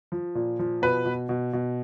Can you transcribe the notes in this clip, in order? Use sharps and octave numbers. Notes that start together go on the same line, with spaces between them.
F3
A#2
F3
B2 B4
B2
B2
B2